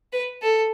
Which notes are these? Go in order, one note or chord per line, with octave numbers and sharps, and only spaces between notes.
B4
A4